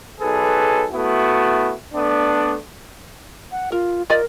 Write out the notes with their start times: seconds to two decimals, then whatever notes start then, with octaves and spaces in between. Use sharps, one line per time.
0.20 B1 G#4 A4 B4
0.93 A3 B3 E4 F#4
1.94 A3 B3 D4
3.52 F#5
3.72 F4 A#4
4.10 F4 A#4 D5 D#5